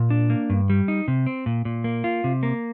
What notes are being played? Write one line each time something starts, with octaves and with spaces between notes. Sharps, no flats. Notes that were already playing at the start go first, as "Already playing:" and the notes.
Already playing: A#2
D4
A#3
G2
G3
D#4
C3
C4
A#2
A#2
A#3
F4
C3
A#3